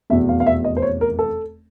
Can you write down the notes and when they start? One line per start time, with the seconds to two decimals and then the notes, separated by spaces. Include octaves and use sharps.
0.10 F1 E2 B2 E5
0.29 F5
0.40 F5
0.46 E5
0.64 D#5
0.77 C5
0.82 C#5
1.01 A#4
1.19 A4